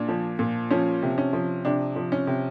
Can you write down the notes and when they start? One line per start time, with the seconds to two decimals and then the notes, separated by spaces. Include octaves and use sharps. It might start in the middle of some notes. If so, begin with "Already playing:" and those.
Already playing: A#2 D4
0.09 F3
0.39 A#2
0.71 F3 C#4
1.02 C3
1.18 C#4
1.33 F3
1.65 C3 D4
1.96 F3
2.12 C#4
2.27 C3